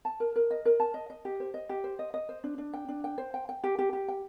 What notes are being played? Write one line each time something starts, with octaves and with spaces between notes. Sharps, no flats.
A5
A#4
A#4
D#5
A#4
A5
D#5
D#5
G4
C5
D#5
G4
C5
D#5
D#5
C5
D4
D4
G5
D4
G5
C5
G5
G5
G4
G4
G4
G5